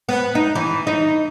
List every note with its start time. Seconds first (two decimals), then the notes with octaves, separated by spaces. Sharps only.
0.09 B3
0.35 D#4
0.55 E3
0.87 D#4